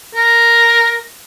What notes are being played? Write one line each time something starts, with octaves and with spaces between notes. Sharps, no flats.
A#4